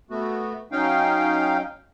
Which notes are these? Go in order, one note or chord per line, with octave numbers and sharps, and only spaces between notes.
A3 B3 F#4
F#3 C#4 D#4 F5 G5